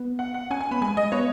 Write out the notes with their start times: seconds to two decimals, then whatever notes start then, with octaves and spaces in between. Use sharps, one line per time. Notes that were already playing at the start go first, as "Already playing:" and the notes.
Already playing: B3
0.19 F#5
0.34 F#5
0.51 C#4 G#5
0.61 G#5
0.71 B3 B5
0.82 G#3 G#5
0.97 G#3 D#5
1.12 B3 C#5